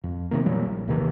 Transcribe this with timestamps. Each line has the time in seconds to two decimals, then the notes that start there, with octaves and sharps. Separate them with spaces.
0.04 F2
0.31 C3 D#3 A#3
0.45 A#2 E3 F#3 G3
0.66 A#1
0.88 D#2 C3 D#3 E3